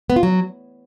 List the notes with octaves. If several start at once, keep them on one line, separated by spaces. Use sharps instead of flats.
B3
F4
F#3